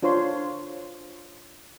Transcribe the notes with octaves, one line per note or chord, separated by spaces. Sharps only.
D4 F4 C5 C#5 C6